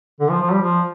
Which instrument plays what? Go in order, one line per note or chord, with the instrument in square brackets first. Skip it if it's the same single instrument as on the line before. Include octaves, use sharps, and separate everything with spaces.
[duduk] D3
F3
F3
G3
F3